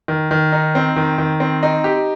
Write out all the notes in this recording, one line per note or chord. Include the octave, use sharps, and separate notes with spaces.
D#3
D#3
D#4
C4
D#3
D#3
C4
D#4
G4